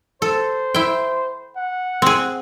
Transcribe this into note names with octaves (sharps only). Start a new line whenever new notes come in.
A4 C5
E4 G5
F#5
C4 G#4